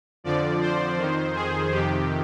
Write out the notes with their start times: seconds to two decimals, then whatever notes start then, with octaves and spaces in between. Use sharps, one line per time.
0.24 F2 D3 F3 D5
0.61 C5
0.98 F2 D#3
1.35 G#4
1.72 F2 C3 D#3 G4